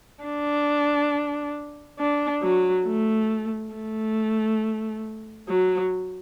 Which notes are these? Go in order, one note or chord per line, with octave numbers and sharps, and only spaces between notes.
D4
D4
F#3
A3
A3
F#3